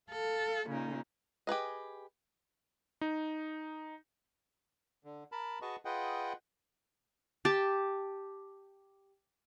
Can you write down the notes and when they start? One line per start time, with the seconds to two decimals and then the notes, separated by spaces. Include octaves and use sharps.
0.10 A4 F5
0.68 A#2 C#3 D#4
1.47 G4 G#4 B4 D#5
3.01 D#4
5.04 D3
5.32 A#4 A5 B5
5.62 F#4 G#4 B4 D#5 A5 C#6
5.85 F4 G#4 B4 D#5 F#5 G5
7.45 G4 A5